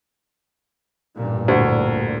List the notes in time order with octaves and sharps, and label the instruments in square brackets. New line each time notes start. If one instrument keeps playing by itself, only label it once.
[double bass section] A1 G2 A#2
[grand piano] D2